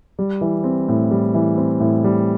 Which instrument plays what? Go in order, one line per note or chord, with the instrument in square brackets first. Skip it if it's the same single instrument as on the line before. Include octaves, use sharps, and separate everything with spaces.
[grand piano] G3
E3
C4
A2
G3
E3
C4
A2
G3